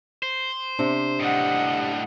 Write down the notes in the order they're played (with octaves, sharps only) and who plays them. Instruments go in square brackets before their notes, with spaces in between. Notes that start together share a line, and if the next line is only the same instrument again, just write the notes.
[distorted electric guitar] C5
[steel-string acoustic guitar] C3 [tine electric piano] D4
[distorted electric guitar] A2 G3 [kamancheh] D#5 F#5